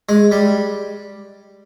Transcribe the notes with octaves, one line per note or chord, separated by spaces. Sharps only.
G#3
G3